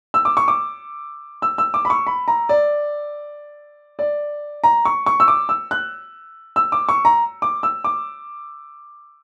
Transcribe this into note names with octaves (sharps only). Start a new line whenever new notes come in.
E6
D6
C#6
D6
E6
E6
D6
B5
C#6
B5
A#5
D5
D5
A#5
C#6
C#6
E6
D6
E6
F#6
E6
D6
C#6
A#5
D6
E6
D6